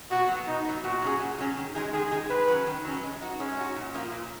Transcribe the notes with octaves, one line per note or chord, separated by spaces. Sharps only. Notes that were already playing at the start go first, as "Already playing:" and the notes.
B2 F#4
F#3 B3
B2 D#4
F#3 B3
A#2 F#4
F#3 C#4 G#4
A#2
F#3 C#4 G#4
D#3
G#3 D#4 G#4
D#3 G#4
G#3 D#4 G#4
D#3 B4
F#3 C#4
D#3
F#3 C#4
G#3
D#4 F#4
G#3 C#4
D#4 F#4
A#2
F3 A#3 F4
A#2